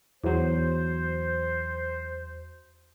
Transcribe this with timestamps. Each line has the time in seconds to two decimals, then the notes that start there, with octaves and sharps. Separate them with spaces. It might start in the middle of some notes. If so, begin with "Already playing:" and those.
0.24 E2 F#3 C5